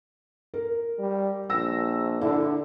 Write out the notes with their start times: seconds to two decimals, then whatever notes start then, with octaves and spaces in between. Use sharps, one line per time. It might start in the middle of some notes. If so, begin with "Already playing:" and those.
0.54 A#4
0.98 G3
1.50 A#1 E6 A#6
2.21 D3 E4